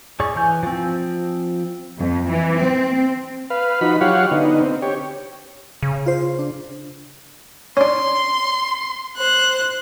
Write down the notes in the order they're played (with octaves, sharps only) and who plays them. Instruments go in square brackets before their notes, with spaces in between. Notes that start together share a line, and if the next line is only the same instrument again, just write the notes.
[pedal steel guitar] G#4 C#5 D5 C#6
E3 G#5 G6
F3 C4
[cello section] F2
E3
C4
[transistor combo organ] B4 F5
F3 D#4 F#4 B5
F#3 F4 G4 C#5 F5 F#5
D3 B3 D#4
C4
G4 C#5
[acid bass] C#3
[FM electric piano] F4 C5
D4
[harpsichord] C#4 D4 [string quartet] C6
[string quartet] C5 F#6